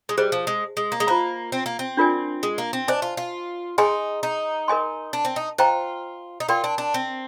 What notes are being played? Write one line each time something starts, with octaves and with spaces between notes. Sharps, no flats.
G#3
G3 G#4 C5 D#5
F3
G#3
G#3
A#3
G#3
A#3 F4 C5 D#5 A#5
C4
A#3
C4
D4 F4 A#4 D5 G#5
G#3
A#3
C4
D4 C5 D#5 G#5
F4
F4
D#4 G#4 D#5 G#5 C6
D#4
A#4 D#5 G#5 C6
D4
C4
D#4
F4 C5 D#5 G5 A#5
D#4
F4 A#4 D5 G5 C6
D4
D4
C4